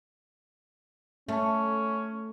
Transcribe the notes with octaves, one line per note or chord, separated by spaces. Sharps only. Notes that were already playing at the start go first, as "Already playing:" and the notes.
A3 C#4